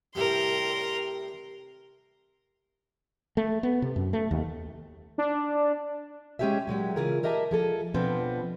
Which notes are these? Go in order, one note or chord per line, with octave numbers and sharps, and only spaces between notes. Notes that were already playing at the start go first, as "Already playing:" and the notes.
A2 C3 G3 A#4 C6
A3
B3
C3
F#2
A3
D#2
D4
G#3 C#4 D4 G4 G#4 E5
A#2 F#3 G#3 G4
C#3 E3 F4 G#4 A#4
G4 A#4 D#5 E5 G#5 A5
F3 G#4 A4
B2 F3 B3 C4 D4